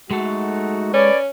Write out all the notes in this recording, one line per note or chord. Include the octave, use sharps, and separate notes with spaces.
G#3 A3 D#4 F#4 A4
C#4 B4 C#5 D5